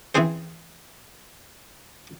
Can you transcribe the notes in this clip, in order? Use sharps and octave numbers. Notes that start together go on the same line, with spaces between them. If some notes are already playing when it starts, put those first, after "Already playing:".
E3 C4 C#4 G#4 C5